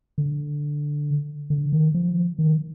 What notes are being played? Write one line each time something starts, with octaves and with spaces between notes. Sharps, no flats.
D3
D3
D#3
F3
D#3